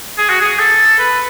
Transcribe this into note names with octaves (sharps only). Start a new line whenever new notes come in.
G#4
F#4
G#4
A4
B4